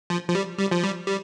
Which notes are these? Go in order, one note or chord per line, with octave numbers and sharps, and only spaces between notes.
F3
F3
G3
G3
F3
G3
G3